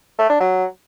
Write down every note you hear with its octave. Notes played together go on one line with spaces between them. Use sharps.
A3
D4
F#3